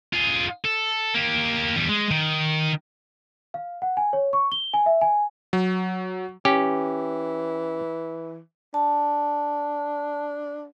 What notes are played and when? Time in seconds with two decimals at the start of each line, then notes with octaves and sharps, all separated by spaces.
0.13 F4 G#4
0.64 A4
1.14 A#3 G4
1.76 E2 G3
1.89 G#3
2.11 D#3
3.54 F5
3.82 F#5
3.97 G#5
4.13 C#5
4.33 C#6
4.52 G7
4.74 G#5
4.86 E5
5.01 G#5
5.53 F#3
6.45 E3 C#4 G4
8.74 D4 A5